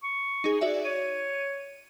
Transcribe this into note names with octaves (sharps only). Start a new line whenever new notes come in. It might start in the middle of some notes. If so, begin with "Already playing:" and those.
C#6
D#4 G#4
F#4 D5 E5
C#5 D#7